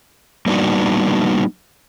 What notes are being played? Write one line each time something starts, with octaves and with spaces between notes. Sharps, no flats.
G3 A#3 B3 D4 D#4 F#4